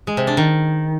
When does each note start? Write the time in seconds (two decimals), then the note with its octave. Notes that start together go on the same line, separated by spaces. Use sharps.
0.07 G#3
0.17 C3
0.27 D4
0.37 D#3